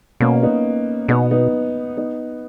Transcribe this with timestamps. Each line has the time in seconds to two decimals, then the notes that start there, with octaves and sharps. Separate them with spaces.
0.20 B2 A#3 C#4
0.43 B3 D#4
1.08 B2 B3 D#4
1.31 B3 D#4
1.97 B3 D#4